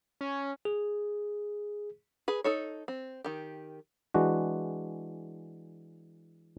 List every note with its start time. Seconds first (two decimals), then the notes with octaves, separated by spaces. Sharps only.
0.21 C#4
0.65 G#4
2.28 G#4 B4
2.44 D#4 A4 C#5
2.88 C4
3.24 D#3 G4
4.14 E3 G#3 D4 F#4